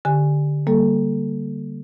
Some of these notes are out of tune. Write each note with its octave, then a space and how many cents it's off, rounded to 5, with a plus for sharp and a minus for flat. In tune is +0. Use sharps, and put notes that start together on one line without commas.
D3 +0 G4 +0 G#5 -5
G3 +0 A#3 +0 A4 +0